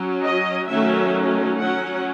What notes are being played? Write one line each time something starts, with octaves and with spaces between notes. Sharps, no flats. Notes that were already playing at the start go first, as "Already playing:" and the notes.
Already playing: F#3 C#4
D#5
D#3 F#3 A3 C#4 E5
F#3 C#4 F#5